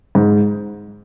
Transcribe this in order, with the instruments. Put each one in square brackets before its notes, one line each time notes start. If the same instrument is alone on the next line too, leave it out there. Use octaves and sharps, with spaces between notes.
[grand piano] G#2